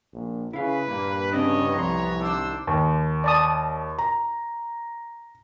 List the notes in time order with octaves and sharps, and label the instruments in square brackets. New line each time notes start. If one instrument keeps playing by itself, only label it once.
[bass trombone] A#1
[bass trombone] C#3 [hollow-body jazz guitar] E4 F5 [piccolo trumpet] B4
[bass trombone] G2 [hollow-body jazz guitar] A#2 [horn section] A#3
[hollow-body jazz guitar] C#3 C4 D4 [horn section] E3 B3 C#5 [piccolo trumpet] D#5
[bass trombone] C2 [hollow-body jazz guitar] F2 C6 [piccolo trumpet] A#5
[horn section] D#3 D4 C5 [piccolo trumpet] E6
[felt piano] D#2
[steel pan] D5 A5 D#6
[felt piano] A#5